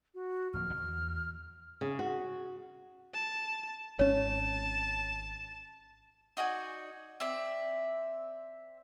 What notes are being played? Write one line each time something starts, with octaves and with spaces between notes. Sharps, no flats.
F#4
D1 F3 A#3 F6
E2
C#3
F#4
A5
G#1 C#4 C#5 A5
D#4 F#4 D5 G#5
C4 D5 E5